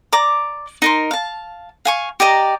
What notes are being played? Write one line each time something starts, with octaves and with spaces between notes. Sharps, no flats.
D5 A#5 D6
D#4 A#4 C6
F5 A5
F5 G#5 C#6
G4 D5 D#5 A#5